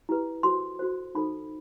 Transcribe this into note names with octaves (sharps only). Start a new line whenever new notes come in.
E4 G4 B4
F#4 A4 C5 C6
F#4 A4 C5
D#4 A4 C5 B5